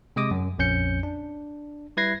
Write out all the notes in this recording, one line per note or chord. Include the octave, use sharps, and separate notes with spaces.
C3 G#3 D#5 D6 D#6
F#2
A#1 F2 C#4 G6 C#7
D4
G3 E4 B4 G#6 A#6 C7